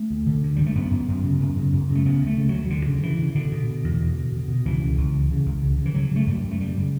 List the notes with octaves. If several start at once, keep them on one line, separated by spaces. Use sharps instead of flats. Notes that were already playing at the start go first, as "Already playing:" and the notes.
Already playing: A3
D2
D3
D2
D3 G3
A3
F#2 B3
F#2
F#2
C#3
F#2
C#3
F#2
C#3
A3
C#3 B3
D2
A3
C#3
D2 F#3
D2 D3
C#3
C#3 E3
C#3
B2 D3
B2
B2
E2
B2
B2
B2
B2
C#2 E3
C#3
C#2
C#3
C#3
C#2
C#3
C#3
E3
C#3 F#3
C#3 A3
F#2 G3
F#2
A3
C#3 G3
C#3